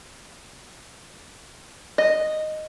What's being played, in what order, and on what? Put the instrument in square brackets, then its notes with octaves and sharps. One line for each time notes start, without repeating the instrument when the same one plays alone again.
[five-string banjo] D#5